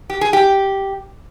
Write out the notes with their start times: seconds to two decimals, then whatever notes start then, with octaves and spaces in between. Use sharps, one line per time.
0.10 G4
0.21 G#4
0.33 G4